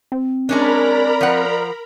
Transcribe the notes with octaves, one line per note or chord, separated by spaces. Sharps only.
C4
G#3 C#4 D4 A#4 D5 A#5 B5
F3 F#5